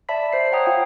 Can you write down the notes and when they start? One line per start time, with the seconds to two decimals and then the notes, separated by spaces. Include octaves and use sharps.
0.09 D5 E5 A5 B5 B6
0.33 C5 C7
0.52 C#5 F#5 G5 A#5 D#6
0.66 F4 F5 G5 D#6